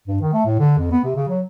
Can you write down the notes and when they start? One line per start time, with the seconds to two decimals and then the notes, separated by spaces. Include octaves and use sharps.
0.08 G2
0.21 D#3
0.33 A3
0.45 A2
0.59 D3
0.79 F2
0.92 B3
1.04 C3
1.16 C#3
1.29 F#3